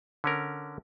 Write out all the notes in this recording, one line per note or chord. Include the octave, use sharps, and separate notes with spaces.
D3 C#4 A#4